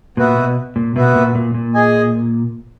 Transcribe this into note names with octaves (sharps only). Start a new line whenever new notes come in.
A#2 B3 F#4 B4 E5
B2
A#2
B2 B3 F#4 B4 E5
A#2
A#2
A#2
G#4 D#5 G#5